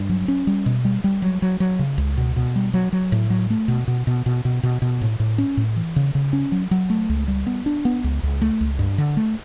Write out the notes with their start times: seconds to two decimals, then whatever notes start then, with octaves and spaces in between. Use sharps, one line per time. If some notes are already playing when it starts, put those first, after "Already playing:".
Already playing: G2
0.09 F#3
0.28 C#4
0.47 G3
0.66 B2
0.85 G3
1.04 G3
1.22 F#3
1.42 F#3
1.60 F#3
1.79 C#3
1.98 C#2
2.17 B2
2.36 B2
2.56 G3
2.74 F#3
2.93 F#3
3.12 A2
3.30 F#3
3.50 A3
3.68 B2
3.88 B2
4.07 B2
4.26 B2
4.45 B2
4.63 B2
4.82 B2
5.01 A2
5.20 A2
5.38 C#4
5.57 A2
5.76 E3
5.96 C#3
6.15 C#3
6.33 C#4
6.52 F#3
6.71 F#3
6.90 A3
7.09 C#2
7.28 G3
7.47 B3
7.66 D4
7.85 B3
8.04 C#2
8.23 C#2
8.41 A3
8.61 C#2
8.79 G2
8.98 D3
9.17 A3